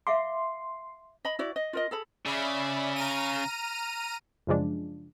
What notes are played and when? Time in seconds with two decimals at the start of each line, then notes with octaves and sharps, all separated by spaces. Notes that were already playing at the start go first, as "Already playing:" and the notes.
0.07 E5 F5 C6 D6
1.25 D#5 B5
1.39 E4 F#4 D5
1.56 D#5
1.73 F4 A#4 D#5
1.91 G#4 A4 B5
2.25 C#3 D5 E5 B5
2.96 A#5 F6 D#7
4.47 F#2 C#3 F3 G#3 D4